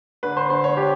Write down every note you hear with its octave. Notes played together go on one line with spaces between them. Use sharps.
D3 B4
C5
D3 C5
C#5
D4 G4